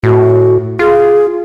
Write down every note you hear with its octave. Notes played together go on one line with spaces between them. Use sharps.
A2 F#4
F4 G#4